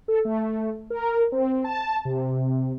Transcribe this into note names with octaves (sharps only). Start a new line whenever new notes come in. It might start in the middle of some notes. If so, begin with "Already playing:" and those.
A4
A3
A#4
C4
A5
C3